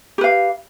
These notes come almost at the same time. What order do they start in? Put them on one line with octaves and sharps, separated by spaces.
G4 B4 F5